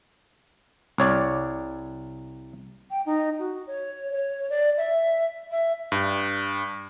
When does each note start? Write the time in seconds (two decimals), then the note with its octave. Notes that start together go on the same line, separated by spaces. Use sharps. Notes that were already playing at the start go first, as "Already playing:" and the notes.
0.98 C2 C#5 D5
2.91 G5
3.06 D#4
3.39 F#4
3.67 C#5
4.12 C#5
4.50 D5
4.77 E5
5.51 E5
5.92 G2